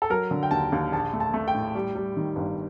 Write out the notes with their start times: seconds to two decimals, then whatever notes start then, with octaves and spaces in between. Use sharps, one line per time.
0.02 A4
0.10 F#3 A#4
0.31 D3
0.43 G5
0.51 D#2 A5
0.72 D#2
0.92 A#1 A5
1.13 A3
1.20 A5
1.34 A3
1.48 G5
1.54 A2
1.75 G3
1.95 G3
2.17 D#3
2.36 G1